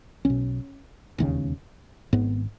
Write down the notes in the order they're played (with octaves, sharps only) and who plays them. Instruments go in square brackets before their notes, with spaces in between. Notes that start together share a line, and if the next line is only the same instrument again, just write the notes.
[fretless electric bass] B1 B2 C#4
E1 D#2 C#3
G#1 G#2 B3